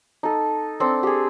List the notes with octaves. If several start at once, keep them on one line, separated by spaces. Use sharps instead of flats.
D#4 A4
C4 D4 A4 A5
G4 G#4